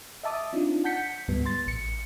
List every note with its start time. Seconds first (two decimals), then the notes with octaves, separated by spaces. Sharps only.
0.23 D#5 E5 A5 D6 D#6
0.53 C4 D4 D#4 F4
0.84 F#5 A5 G6 B6 C#7
1.28 D2 G#2 G3 B3
1.45 C6 A6
1.66 A1 C#7